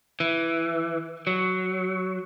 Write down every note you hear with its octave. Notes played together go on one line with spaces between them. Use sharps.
E3
F#3